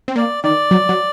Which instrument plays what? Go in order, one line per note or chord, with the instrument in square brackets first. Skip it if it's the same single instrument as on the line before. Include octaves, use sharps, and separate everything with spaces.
[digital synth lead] C4
[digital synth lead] A#3 [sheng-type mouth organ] D5
[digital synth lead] D#3 [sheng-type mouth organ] D5
[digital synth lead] F#3
F#3